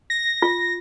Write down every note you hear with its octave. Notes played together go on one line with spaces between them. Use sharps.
A#6
F4